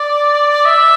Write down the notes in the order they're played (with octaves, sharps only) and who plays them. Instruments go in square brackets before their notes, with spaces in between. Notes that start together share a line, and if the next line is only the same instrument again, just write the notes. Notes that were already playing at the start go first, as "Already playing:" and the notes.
Already playing: [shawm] D5
E5